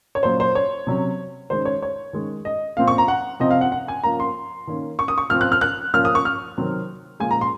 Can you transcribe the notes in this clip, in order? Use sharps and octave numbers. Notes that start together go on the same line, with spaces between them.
C#5
A#2 F#3 C#4 C5
C5
C#5
C3 F#3 C#4
D#3 G#3 C#4 C5
C#5
C#5
D#3 G#3 C#4
D#5
A#2 F3 C4 F5
C#6
A#5
F#5
C3 F3 C4 D#5
F5
F#5
F#5
G#5
F3 A#3 C#4 A#5
C6
D#3 A#3 C#4
C#6
D#6
C#6
F3 C4 F6
F#6
F6
F#6
F3 A#3 C#4 F6
D#6
C#6
F6
C3 D#3 F#3 C4
A#2 F3 G#3 G#5
A#5
C6